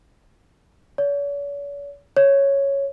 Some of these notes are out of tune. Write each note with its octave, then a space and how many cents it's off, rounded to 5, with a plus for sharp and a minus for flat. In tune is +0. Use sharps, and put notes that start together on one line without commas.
C#5 +45
C#5 -5